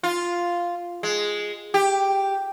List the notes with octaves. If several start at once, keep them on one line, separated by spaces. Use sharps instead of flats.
F4
G#3
G4